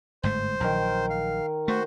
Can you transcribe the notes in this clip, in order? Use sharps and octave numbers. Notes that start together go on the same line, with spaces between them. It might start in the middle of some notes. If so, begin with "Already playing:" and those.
G1 G#2 A3 C5
A#1 D#3 F#3 A#4
F5
A3 F#4 C5